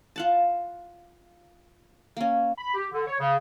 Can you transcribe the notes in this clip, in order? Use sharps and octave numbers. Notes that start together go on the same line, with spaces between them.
F4 F#5 A5
A#3 C#4
B5
G4
D3
C#5
C#3